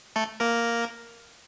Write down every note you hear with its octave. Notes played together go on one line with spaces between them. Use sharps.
A3 A4
A#3 A#4